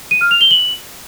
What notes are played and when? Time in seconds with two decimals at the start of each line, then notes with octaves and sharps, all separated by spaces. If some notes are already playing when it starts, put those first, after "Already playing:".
0.11 D#7
0.21 F6
0.31 F7
0.41 G7
0.51 F#7